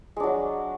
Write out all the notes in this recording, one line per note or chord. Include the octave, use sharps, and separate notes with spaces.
F#3 G#3 D4